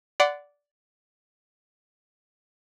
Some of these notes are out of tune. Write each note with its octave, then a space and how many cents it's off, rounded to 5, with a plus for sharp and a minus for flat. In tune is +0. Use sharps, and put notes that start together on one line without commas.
D5 -10 F#5 +0 C6 -40